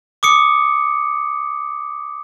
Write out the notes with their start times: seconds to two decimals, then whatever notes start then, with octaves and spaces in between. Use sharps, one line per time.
0.23 D6 D#6 C#7